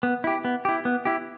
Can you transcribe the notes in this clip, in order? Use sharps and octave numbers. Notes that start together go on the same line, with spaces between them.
B3
E4 G4
B3
E4 G4
B3
E4 G4